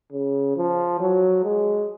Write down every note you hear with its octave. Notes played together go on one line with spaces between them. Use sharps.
C#3
F3
F#3
G#3